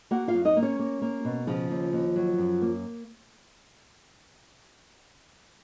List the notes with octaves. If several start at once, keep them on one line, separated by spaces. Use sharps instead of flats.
A#3 F#4 F#5
F4 F5
F#2
D#4 D#5
A#3
C#4 C#5
A#3
A#3
B2
C#3 F3 F4
D#2
D#2
F#3
F#2
A#3